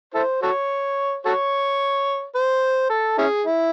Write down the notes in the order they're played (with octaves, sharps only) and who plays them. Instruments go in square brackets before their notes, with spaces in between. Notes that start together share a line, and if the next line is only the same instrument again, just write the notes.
[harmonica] E4 A4 C5
F#4 A4 C#5
F#4 A4 C#5
C5
A4
C#4 E4 G#4
E4